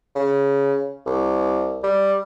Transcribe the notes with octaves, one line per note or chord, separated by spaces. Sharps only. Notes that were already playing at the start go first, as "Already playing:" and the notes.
C#3
C2
G3